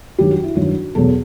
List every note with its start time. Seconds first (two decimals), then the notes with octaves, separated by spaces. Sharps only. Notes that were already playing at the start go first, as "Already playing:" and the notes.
0.19 G2 D#3 F#3 G4
0.31 F#4
0.44 E4
0.55 G2 D#3 F#3 F#4
0.95 E2 B2 F#3 A4